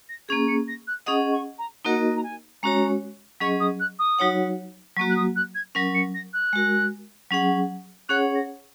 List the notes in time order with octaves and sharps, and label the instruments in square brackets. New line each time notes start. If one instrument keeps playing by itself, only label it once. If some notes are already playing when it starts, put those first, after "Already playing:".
[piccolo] A#6
[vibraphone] A#3 C#4 G#4 [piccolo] G#6
[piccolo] C#7
A#6
F#6
[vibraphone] C#4 G#4 D#5 F#5 [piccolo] D#6
[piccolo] C#6
A#5
[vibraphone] A#3 D#4 F#4 A#4 D#5 [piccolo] F#5
[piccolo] A#5
G#5
[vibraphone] G#3 C#4 F#4 C#5 [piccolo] A#5
[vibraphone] F#3 C#4 G#4 D#5 [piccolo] C#6
[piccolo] D#6
F#6
D#6
[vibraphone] F#3 D#4 F#4 C#5 F#5
[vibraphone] F#3 A#3 F#4 [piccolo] C#6
[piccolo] F#6
D#6
F#6
G#6
[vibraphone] F#3 C#4 A#4 [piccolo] A#6
[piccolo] C#7
A#6
F#6
[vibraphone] G#3 F#4 A#4
F#3 C#4 G#4 F#5
[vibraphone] C#4 G#4 C#5 F#5 [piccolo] F#6
[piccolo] A#6